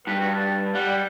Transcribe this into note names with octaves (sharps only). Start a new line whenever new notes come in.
G2 B4
F#4
A5
G3 F#5